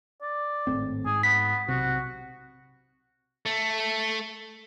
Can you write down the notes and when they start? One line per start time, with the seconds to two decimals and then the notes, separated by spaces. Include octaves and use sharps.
0.22 D5
0.67 G#1 A2 C4
1.06 G#2 G#4
1.23 B3 B6
1.68 B1 C3 F#4
3.46 A3